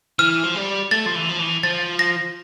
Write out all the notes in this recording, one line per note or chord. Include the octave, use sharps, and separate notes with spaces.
E3 F6
F3
G3
A3 A6
F3
E3
F3
E3
F3 A6
A#6